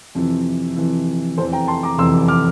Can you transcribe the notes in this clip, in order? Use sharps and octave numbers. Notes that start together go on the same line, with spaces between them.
F2 C3 E3
F2 C3 E3
F1 E2 C3 E3 A4 C5
G5 A#5
A5 C6
A#5 D6
F1 E2 C3 E3 C6 E6
D6 F6